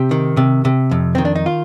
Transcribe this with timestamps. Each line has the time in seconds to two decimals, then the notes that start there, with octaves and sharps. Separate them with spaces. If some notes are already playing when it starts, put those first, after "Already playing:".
Already playing: C3 G4
0.11 D#3
0.37 C3
0.65 C3
0.91 F2
1.15 D#3 C4
1.25 D4
1.35 D#4
1.46 F4